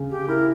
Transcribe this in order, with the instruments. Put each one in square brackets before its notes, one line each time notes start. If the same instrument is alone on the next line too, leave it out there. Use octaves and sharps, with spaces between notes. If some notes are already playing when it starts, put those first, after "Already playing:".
Already playing: [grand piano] C#3
[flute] G4
[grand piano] E4 [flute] A#4